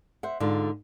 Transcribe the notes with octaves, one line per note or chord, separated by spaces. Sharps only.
C5 E5 F#5
G#2 D3 F4